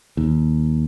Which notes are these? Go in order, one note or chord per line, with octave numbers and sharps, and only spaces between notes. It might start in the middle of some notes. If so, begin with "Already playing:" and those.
D#2